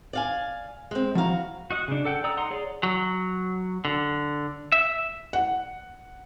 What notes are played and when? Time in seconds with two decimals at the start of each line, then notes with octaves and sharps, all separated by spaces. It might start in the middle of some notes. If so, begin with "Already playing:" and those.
0.13 D5 F5 G#5
0.91 G#3 C4
1.15 F3 E4 F#4 F5 A#5
1.71 F#4 D#5 F#5
1.88 C#3 D4
2.05 A4 F#5 G5
2.24 D5 A#5 D#6 E6
2.37 D#4 F#5 A#5 C6
2.51 G#4 C#5 D5
2.83 F#3
3.85 D3
4.72 E5
5.33 F#5